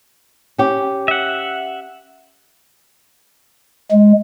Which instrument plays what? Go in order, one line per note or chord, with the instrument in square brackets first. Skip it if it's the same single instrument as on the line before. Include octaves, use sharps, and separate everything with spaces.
[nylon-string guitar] C#4 G4
[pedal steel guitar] E5 F#5
[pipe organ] G#3